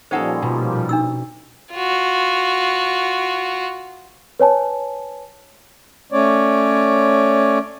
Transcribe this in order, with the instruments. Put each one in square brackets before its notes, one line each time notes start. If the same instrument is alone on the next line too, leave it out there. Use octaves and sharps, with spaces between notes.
[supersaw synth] A#2 F3 G3 [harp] C#4 D#4 A4 [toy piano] C5 F#5
[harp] B2
[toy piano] D4 D#4 E6
[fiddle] F4 F#4
[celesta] B4 C#5 G#5 A5
[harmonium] A3 C#4 C#5 D5